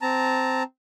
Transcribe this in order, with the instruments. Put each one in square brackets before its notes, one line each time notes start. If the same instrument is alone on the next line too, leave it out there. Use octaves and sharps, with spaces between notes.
[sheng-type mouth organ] C4 A5 A#5